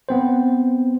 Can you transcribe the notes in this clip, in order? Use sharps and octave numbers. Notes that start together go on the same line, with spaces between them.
B3 C4 C5